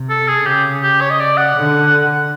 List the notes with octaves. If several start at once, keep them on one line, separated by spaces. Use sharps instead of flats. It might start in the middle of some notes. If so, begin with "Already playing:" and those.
Already playing: C3
A4
G#4
C#3 G4
G4
C#5
D#5
D5
F#5
D3